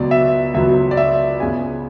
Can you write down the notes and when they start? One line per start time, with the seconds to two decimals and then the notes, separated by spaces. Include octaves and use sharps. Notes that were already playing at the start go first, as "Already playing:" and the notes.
Already playing: C#2 B2 F#3 B3 D5
0.11 E5
0.54 C#2 B2 F#3 B3 E5
0.91 D5
0.97 E5
1.40 C#2 C#3 G#3 B3 G#5